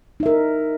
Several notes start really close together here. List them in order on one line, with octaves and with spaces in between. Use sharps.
D#4 E5 A#4